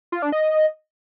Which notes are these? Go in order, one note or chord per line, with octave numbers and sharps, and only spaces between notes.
F4
D4
D#5